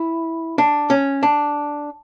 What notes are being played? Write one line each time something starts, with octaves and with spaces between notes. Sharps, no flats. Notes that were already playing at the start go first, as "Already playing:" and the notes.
Already playing: E4
D4
C#4
D4